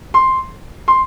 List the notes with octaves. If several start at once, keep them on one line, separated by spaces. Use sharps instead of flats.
C6
C6